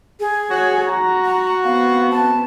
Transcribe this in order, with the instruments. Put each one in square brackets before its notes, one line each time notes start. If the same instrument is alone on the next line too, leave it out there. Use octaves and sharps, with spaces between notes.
[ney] G#4
[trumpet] F#4 [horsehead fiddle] C#5
[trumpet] F#4 [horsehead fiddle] A#5
[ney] F#5
[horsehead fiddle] B3 C4 [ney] F5
[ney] A5